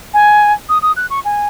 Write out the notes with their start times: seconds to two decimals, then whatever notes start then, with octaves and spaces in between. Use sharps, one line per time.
0.14 G#5
0.69 D#6
0.82 D#6
0.96 F#6
1.10 C#6
1.25 G#5